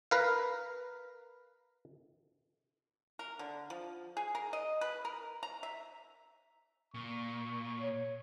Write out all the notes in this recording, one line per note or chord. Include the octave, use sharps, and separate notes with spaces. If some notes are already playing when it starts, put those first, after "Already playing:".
A#4 B4 F5
A#4
D3
F3
G#4
A#4
D#5
B4
A#4
A#5
E5
A#2 C#6
C#5